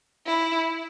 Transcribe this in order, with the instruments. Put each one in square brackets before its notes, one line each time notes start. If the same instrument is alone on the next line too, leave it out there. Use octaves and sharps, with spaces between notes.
[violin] E4